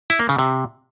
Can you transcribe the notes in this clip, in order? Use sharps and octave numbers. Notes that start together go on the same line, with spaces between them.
E4
A#3
C#3
C3